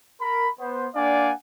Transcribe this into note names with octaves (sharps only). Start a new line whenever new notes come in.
A#4 B5
B3 C5
A#3 D4 D5 F5 F#5 G#5